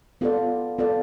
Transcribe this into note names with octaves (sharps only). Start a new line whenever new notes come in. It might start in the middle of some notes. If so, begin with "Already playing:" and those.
B3 F4 A4 D5
B3 F4 A4 D5